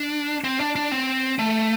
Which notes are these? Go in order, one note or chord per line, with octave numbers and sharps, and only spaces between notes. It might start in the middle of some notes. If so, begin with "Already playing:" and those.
Already playing: D4
C4
D4
D4
C4
A3